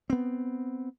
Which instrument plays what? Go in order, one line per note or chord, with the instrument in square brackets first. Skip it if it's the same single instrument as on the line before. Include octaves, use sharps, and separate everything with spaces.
[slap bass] B3 C4